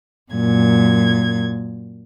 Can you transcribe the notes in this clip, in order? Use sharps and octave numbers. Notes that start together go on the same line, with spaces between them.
F#2 A#2 G#6